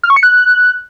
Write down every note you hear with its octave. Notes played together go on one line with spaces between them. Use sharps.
F6
C#6
C#7
F#6